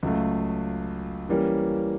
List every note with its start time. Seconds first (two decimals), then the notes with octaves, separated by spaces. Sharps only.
0.03 C#2 C#3 F#3 A3
1.29 E3 G3 A#3 C#4